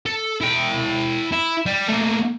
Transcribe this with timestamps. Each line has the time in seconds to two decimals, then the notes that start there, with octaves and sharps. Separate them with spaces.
0.06 A4
0.41 E4 G5
1.32 E4
1.66 G3
1.89 A3 A#3